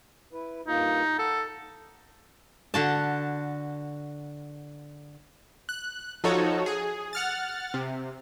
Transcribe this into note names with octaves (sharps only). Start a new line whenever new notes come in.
E4 B4
G2 A#3 D#4 F4
A4 F#5
D3 F#4 A5
F#6
F3 D#4 F#4 A4 C#5
G#4
F#5 F6 A6
C3